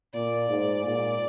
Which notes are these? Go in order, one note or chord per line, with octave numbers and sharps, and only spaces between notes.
A#2 D5
G#2
A#2